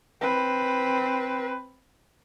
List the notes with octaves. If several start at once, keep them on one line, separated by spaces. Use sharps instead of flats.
C4 B4